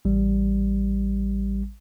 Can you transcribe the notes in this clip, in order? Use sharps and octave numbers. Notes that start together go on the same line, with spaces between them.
A1 G3